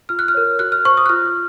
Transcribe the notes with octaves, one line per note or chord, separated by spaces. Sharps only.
F4 F6
F#6
F6
A#4 C#5
F#4 F#6
F6
C5 C#6
D#6
F#6
F4 F6